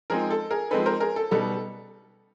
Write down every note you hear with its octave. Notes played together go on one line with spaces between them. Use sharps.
F3 G#3 C4 D#4 G#4 A#4
A4
G#4 A#4
F3 G#3 C4 D#4 A4 B4
A#4 C5
G#4 A#4
A4
B2 G3 B3 D#4 A4